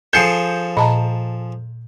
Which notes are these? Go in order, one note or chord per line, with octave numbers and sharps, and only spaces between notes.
F3 G#4 A4 G6 C7 C#7
A#2 D#5 A5 A#5